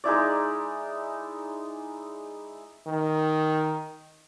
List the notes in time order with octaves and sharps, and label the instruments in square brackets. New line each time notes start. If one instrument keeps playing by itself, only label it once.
[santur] G#3 D#4 E4 D5
[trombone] D#3